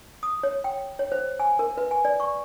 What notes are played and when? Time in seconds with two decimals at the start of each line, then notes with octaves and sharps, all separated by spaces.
0.23 D#6
0.43 C#5
0.64 G5
0.99 C#5
1.12 C5
1.40 G#5
1.59 A#4
1.77 B4
1.91 G#5
2.05 D5
2.20 C#6